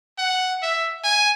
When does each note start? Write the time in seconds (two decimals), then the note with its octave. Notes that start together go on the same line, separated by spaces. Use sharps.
0.18 F#5
0.62 E5
1.04 G#5